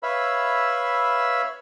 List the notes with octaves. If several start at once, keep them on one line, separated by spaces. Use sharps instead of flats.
B4 C#5 E5 F5 B5 E6